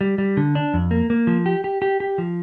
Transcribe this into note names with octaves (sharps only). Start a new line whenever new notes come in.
G3
G3
D3
D4
F2
A#3
A#3
F3
G4
G4
G4
G4
F3